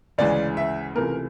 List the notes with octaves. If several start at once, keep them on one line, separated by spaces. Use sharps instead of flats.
D2 C#3 E3 G#3 D5
E5
C#2 C3 E3 A3 A#4